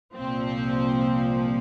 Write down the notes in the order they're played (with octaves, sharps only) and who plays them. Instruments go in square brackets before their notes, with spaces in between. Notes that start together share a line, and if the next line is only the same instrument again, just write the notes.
[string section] C2 A#2 F3 C4